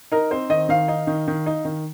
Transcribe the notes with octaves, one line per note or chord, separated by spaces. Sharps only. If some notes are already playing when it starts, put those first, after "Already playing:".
D#4 A#4
C4 C5
D#3 D#5
D#3 F5
D#4
D#3
D#3
D#4
D#3